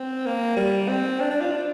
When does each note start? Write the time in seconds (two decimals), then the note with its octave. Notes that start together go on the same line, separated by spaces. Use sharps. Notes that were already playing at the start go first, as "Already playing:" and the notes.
Already playing: C4
0.26 A#3
0.56 G3
0.88 C4
1.20 D4
1.30 D4
1.40 F4
1.51 D4